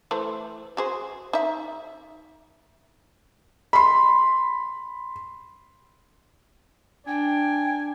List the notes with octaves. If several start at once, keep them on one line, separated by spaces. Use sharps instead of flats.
E3 A3 C5
F#4 G#4 C5
D#4 E5
B5 C6
D4 G5 G#5